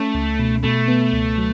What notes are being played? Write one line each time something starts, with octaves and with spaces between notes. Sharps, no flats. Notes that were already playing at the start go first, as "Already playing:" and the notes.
Already playing: A3 C#4
C#2
B2
B2 A3
B3
C#2
F#3